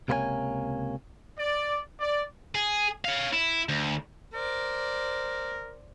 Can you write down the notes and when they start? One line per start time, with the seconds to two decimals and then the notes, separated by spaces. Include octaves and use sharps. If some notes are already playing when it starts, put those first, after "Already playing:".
0.08 C#2 C3 A#3 B4 C#5 G#5
1.38 D5
1.99 D5
2.55 G#4
3.05 C#5 F5
3.33 E4
3.69 D2
4.33 A#4 C5 D5